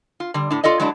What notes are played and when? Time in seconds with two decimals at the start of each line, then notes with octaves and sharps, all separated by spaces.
0.20 F4
0.34 D3 G3
0.50 A2 D4
0.64 F4 A4 D5 D#5
0.80 F#3 G#3 A3 D4 E4